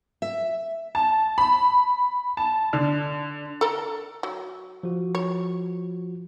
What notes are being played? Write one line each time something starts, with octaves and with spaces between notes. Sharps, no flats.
E5
A5
B5
A5
D3
A4 A#4
F#3
F3 F#4
C#5